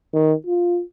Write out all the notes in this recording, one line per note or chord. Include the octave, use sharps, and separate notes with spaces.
D#3
F4